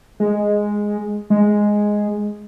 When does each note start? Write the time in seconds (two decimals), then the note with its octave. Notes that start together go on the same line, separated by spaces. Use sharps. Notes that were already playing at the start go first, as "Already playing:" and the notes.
0.20 G#3
1.30 G#3